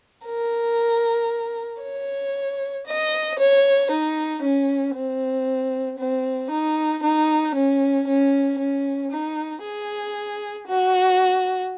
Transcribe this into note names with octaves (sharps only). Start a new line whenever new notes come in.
A#4
C#5
D#5
C#5
D#4
C#4
C4
C4
D#4
D#4
C#4
C#4
C#4
D#4
G#4
F#4